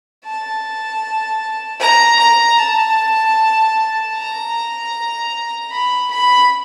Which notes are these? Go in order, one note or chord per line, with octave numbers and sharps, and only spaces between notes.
A5
A#5
A#5
A5
A#5
B5
B5